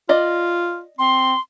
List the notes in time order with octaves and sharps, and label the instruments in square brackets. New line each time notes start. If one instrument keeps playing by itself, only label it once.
[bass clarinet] F4 [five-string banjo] D5 D#5
[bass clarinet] C4 [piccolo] C6